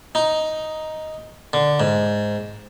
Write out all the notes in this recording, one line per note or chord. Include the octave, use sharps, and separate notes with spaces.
D#4
D3
G#2